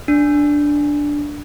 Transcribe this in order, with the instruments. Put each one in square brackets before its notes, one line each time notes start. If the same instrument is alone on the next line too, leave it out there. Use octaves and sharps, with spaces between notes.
[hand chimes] D4